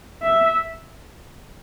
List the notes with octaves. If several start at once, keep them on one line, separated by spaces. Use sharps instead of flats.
E5